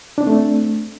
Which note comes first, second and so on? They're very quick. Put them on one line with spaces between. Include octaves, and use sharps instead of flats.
D4 C4 A3